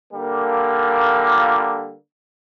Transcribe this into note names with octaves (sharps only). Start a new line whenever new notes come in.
D3 G3 A#3
F4